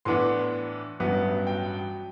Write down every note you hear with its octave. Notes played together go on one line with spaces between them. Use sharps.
A2 E3 B3 D4 C6
A1 G2 F#3 B3
G5